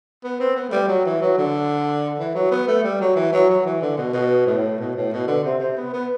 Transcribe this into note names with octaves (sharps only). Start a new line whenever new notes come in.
B3
C4
B3
A3
G3
F#3
E3
F#3
D3
E3
F#3
B3
A3
G3
F#3
E3
F#3
F#3
E3
D3
B2
B2
A2
B2
A2
B2
D3
C3
C3
B3
B3